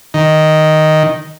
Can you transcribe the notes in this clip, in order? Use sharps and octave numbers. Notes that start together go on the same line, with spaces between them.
D#3